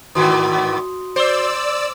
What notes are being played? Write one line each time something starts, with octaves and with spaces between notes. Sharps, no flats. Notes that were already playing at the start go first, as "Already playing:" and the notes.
G#2 D#3 E3 F#4 C6 D#6
C5 D5 E6